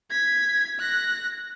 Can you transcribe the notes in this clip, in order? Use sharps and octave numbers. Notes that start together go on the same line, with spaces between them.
G#6 B6
F#6 A#6